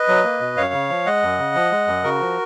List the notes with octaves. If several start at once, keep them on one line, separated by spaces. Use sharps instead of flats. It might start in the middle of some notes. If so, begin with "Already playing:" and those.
Already playing: B4 D#5
F#3
A#3
B2
F#2 C#5 F5
C#3
F3
G#3 D#5 F#5
F#2
C#3
F3
G#3
F#2
C#3 F#4 A#4
F3